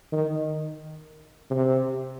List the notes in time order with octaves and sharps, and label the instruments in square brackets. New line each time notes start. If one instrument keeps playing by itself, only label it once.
[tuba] D#3
C3